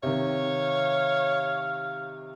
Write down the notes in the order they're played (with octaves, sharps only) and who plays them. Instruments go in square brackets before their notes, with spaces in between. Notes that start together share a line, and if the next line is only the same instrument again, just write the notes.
[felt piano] C3 D#3 [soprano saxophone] C#5 [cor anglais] F5